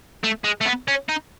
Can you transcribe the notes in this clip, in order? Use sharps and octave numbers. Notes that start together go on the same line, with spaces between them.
A3
G#3
A3
B3
C#4
D#4